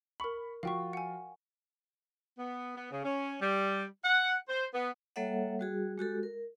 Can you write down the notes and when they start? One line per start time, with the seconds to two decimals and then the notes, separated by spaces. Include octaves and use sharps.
0.20 A#4 B5 C#6 F#7
0.63 F3 F4 F#4 F5 G5 C#6
0.93 F#5 G#5
2.38 B3
2.76 B3
2.91 C#3
3.04 C#4
3.41 G3
4.04 F#5
4.48 C5
4.74 B3
5.16 G3 A#3 A4 C#5 E5 F#5
5.59 G3 F#4 G#4
5.98 G#3 F#4 G4 A4
6.23 A#4